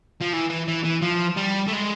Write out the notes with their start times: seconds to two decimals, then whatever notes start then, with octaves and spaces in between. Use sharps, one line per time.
0.21 F3
0.33 E3
0.50 E3
0.68 E3
0.84 E3
1.02 F3
1.37 G3
1.68 A3
1.73 G#3